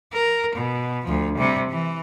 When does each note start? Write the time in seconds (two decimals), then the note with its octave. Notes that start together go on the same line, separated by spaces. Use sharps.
0.13 A#4
0.56 B2
1.05 D2 F3
1.37 C3 G3
1.71 E3